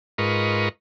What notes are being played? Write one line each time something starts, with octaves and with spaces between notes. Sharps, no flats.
G#2 F4 A#4 B4 D#5 C#6